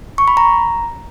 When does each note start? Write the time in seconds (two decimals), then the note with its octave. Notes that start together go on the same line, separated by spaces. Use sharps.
0.18 C#6
0.28 B5
0.37 A#5